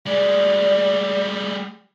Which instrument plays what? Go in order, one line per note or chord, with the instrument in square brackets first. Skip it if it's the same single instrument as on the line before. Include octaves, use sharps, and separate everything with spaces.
[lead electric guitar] G3 G#3 [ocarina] D5